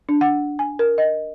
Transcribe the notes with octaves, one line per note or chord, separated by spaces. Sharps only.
D4
F#5
G#5
A#4
D#5